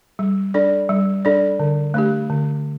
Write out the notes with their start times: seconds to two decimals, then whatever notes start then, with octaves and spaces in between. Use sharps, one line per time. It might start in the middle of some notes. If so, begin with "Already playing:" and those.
0.19 G3
0.54 D4 A4 D5
0.89 G3
1.25 D4 A4 D5
1.60 D3
1.94 A3 D4 G4
2.30 D3